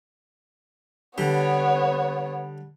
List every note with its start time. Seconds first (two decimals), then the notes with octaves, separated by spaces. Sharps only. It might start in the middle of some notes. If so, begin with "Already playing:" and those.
1.18 D3 G3 B3 C#5